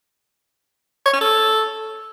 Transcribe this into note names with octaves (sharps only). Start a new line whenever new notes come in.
C#5
C#4
A4